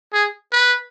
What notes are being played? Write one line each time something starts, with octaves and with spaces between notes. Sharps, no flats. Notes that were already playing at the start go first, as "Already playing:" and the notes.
G#4
B4